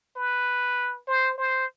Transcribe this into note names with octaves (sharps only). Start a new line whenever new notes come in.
B4
C5
C5